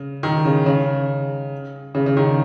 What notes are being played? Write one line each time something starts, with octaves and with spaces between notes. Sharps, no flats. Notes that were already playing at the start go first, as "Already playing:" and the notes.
Already playing: C#3
D#3
C#3
C#3
C#3
C#3
D#3